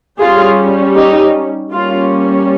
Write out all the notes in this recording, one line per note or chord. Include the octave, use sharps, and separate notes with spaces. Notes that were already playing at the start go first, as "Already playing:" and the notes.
G3 C#4 F4 G#4
D#4 G4
G3 A#3 C#4 F4